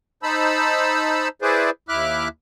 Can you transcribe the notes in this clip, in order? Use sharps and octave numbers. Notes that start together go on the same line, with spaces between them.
D#4 C5 A5 B5 E6
E4 G#4 B4 C5 D5
D#2 E4 E5 D6 F6 F#6